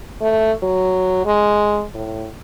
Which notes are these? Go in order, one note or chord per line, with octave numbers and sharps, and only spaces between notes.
A3
F#3
G#3
A2